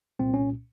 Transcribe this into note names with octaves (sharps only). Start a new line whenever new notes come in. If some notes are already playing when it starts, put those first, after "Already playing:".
C2 A#2 C4
C#4